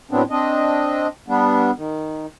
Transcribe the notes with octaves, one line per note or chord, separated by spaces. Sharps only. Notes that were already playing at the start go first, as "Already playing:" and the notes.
A2 F#3 B3 C4 D4
C4 D4 D#5
G3 B3 D4
D#3